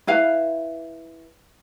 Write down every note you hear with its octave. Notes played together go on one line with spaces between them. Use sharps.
E4 B4 F5